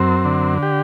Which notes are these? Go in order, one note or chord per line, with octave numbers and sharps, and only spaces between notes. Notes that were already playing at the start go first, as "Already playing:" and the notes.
Already playing: F#2 C4
D3
G4